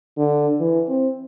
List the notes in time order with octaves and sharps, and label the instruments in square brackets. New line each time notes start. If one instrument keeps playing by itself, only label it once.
[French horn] D3
E3
C4